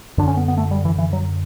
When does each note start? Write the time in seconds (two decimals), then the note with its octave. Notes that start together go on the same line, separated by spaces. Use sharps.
0.18 F#2 D3 D4
0.28 C#4
0.37 B3
0.48 B3
0.57 A3
0.71 G3
0.85 E3
0.98 E3
1.13 F#3